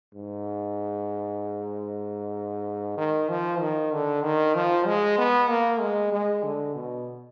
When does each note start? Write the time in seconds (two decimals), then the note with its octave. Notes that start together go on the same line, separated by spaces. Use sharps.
0.14 G#2
2.97 D#3
3.29 F3
3.60 D#3
3.92 D3
4.24 D#3
4.55 F3
4.87 G#3
5.18 B3
5.49 A#3
5.80 G#3
6.12 G#3
6.44 D3
6.75 B2